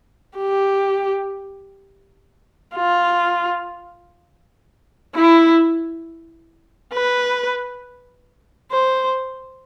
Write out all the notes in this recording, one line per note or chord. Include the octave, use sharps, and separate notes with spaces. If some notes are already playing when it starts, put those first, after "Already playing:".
G4
F4
E4
B4
C5